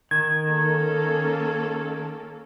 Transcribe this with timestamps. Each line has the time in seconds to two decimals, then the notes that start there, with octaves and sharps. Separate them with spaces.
0.11 D#3 G#6
0.47 A#3 C#4 A4